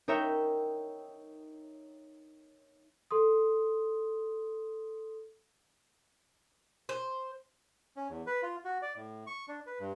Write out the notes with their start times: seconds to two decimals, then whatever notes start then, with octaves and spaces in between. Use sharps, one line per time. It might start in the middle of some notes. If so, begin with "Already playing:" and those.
0.08 D#4 A#4 C#5 E5 G5
3.11 A4 C6 D#6
6.89 C5
7.97 C#4
8.09 E2
8.27 B4
8.42 F4
8.65 F#4
8.82 D5
8.96 A2
9.27 C#6
9.48 D4
9.66 B4
9.80 G2